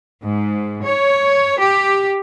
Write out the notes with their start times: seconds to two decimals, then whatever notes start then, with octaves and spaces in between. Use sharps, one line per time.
0.22 G#2
0.84 C#5
1.61 G4